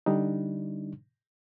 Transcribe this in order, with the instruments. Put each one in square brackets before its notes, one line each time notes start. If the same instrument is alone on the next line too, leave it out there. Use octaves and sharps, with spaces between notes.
[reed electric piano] D3 G3 D4 D#4